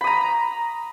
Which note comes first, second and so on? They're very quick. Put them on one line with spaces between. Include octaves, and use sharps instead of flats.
B5 D#6 A#5